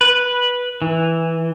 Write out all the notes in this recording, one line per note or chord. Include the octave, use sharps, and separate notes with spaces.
B4
E3